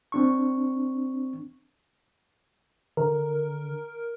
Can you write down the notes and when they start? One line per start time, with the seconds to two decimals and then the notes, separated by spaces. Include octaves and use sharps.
0.12 C4 D4 C#6
2.97 D3 A#4